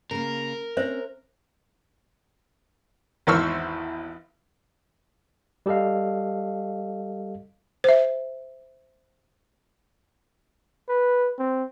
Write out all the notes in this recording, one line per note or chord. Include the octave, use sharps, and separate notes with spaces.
C#3 A#3 A#4
C4 C#4 C5 E5
G#1 E2 C5 C#6 E6 F6
G3 G4 A4 D#5 F5
C5 E5
B4
C4